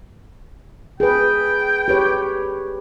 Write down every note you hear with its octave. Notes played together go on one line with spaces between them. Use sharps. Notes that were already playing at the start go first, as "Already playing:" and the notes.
G#4 B4 G5
G4 B4 C#5